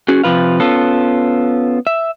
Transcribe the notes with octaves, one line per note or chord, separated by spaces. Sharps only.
C#4 F#4 G#4
C3 E3 F3 B4 F5
B3 C#4 F4 A4
E5